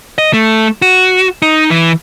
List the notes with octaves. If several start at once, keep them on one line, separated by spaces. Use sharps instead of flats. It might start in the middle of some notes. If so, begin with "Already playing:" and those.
D#5
A3
F#4
D#4
E3